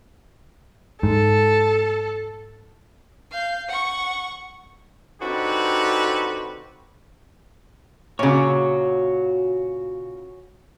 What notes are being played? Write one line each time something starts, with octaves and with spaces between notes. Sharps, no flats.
G#2 A4
F5 G6
F#5 C#6
D3 C4 D#4 F#4 G4 B4
A#2 C#3 F#4 C#5